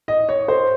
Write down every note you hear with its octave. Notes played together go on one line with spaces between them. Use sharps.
D#5
C#5
C5